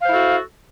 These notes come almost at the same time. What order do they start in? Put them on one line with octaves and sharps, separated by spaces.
F5 C5 E4 A4 F#4